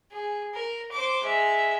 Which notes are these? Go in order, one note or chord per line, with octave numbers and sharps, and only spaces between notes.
G#4
A#4
C5 D6
G#3 E5